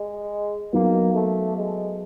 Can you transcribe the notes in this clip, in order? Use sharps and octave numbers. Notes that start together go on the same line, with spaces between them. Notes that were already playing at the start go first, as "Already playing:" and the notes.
Already playing: G#3
F#3 A#3 B3 D#4
A3
G#3